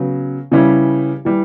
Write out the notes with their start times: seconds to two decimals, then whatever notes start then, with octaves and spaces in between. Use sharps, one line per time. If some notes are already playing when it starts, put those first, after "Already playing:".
Already playing: C#3 F#3 B3
0.51 C#3 E3 G3 C#4 E4
1.25 E3 G3